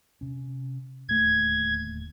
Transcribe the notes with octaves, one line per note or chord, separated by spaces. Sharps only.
C3 C#4
D1 D#2 A3 G#6